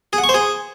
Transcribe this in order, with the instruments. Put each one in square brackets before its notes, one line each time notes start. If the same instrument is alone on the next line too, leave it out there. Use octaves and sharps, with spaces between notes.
[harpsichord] G#4
F#5
C#6
C5
G#4